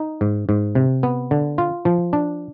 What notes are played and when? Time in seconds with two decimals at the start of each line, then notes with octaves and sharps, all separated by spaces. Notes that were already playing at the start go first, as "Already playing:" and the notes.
Already playing: D#4
0.21 G#2
0.49 G#2
0.75 C3
1.03 B3
1.31 D3
1.58 F4
1.85 F3
2.13 D4